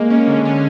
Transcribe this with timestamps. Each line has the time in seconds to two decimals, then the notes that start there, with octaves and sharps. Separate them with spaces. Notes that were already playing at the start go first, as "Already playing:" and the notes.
Already playing: G#3 A#3
0.10 C#4
0.27 D3
0.45 C#4